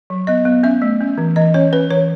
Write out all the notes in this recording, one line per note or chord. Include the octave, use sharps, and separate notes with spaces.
F#3
B3 D#5
B3
C#4 E5
A3
C#4
E3
E3 D#5
C#4 C#5
C#4 B4
E3 C#5